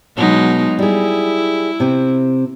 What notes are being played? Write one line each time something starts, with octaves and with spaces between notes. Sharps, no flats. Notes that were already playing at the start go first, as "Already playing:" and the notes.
B2 F#3 G#3 D#4
G3 E4 G#4
C3 C4